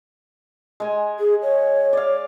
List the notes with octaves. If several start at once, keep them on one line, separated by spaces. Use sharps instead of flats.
G#3 G#5
G#4
C#5
D5 F5